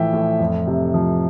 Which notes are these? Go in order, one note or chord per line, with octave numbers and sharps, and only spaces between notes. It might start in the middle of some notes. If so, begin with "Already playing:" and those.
Already playing: A2 E3 F3 E5 G5
A2
F2
C3
F3